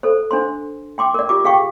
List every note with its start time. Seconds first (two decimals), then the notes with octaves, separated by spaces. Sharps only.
0.03 A4 C5
0.31 D4 C5 C6
0.98 G5 C6 D6
1.14 A#4 D5
1.29 F4 G4 D6
1.44 G#4 F5 G5 C#6